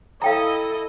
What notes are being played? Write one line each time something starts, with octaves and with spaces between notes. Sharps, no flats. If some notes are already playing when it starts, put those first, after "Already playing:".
E4 A4 D#5 F5 G5 A#5